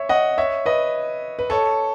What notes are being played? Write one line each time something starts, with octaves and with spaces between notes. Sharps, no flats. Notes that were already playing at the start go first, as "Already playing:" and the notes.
Already playing: C#5 E5
D#5 F#5
C#5 E5
B4 D#5
B4
A4 C#5